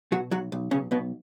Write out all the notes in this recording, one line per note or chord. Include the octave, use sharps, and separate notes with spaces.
B2 F#3 F#4
B1 F#3 F#4
B1
B1 C#3 C#4
B1 B2 B3